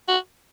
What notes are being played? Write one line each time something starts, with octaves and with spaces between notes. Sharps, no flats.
F#4